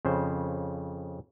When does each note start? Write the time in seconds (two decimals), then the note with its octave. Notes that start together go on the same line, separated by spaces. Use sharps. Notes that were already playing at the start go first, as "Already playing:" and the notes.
0.05 F2 C#3 C5